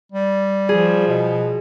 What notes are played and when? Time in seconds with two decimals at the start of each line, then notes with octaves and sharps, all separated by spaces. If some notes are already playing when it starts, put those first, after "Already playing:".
0.12 G3
0.69 F3 G#4
1.07 B2